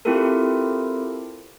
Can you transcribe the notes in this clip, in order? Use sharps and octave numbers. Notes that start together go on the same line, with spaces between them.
C4 E4 F4 G4 A4 A#4